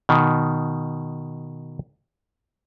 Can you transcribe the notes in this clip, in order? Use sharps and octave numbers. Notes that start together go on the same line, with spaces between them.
B2 D#3